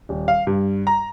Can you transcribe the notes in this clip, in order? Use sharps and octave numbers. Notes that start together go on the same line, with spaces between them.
D#1
F5
G2
A#5